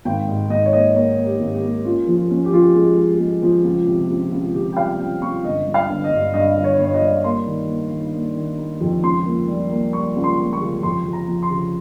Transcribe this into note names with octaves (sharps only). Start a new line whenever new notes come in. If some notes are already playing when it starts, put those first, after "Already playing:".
G#1 G5
G#2
G#1 D#5
C#5
A#3 D#5
A#3 C#5
A#3
G4
G#1
G4
A#3
C#4 F4
F3
F4
C#4
G4
F3 F4
G4
G#3
G#3
G#3
F3
C#2
C3
C#2
C#2
C3 G4
G5
G3 F5
C#2 G5
C#2 C#6
G1 D#5
G2
F5
G1
D#5
G2
G2 D#5
G1
C#5
G1 C#5
D#5
G3
A#3 C6
D#3
A#3
D#3
A#3
D#3
D#4
F2
C#2 C6
A#3
G3
A#3
G3 C#6
C#2
C6
A#3
C#6
C#3
F2 C6
F2
A#5
F3
C6
C#3